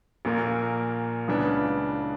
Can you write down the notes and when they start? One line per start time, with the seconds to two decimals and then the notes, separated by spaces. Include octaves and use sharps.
0.25 A#1 A#2 A#3
1.28 C#2 C#3 E3 B3 D4